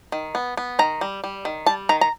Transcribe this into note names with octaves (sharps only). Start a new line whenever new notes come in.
D#3
B3
B3
D#3 A#5
G3
G3
D#3
G3 A5
D#3 A#5
A#5